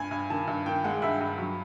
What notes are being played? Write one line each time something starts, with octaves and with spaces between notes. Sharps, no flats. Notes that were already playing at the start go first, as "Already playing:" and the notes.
Already playing: G2 G#5
G2
D#3 A5
G2
D#3 G5
G#3 F#5
G2 E5
G2
F#3